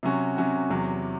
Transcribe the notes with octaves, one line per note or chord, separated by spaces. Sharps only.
C3 F#3 C#4 F#4
C3 F#3 C#4 F#4
E2 C3 F#3